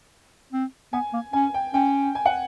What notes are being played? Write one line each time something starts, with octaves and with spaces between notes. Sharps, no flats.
C4
B3 G#5
A#3
C#4 G#5
G5
C#4 G5
G#5
F#5